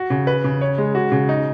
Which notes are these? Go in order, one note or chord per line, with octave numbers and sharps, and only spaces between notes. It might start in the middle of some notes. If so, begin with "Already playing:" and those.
Already playing: F#4
C#3
B4
C#3
C#5
G#3
F#4
C#3
D#4